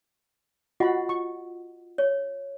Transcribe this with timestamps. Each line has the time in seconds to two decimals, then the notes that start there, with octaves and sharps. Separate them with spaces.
0.80 F4 F#4 D#5 F#5 B5
1.09 C#6
1.98 C#5